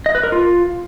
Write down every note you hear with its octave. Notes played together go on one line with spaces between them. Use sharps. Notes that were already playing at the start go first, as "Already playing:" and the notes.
D#5
B4
A#4
F4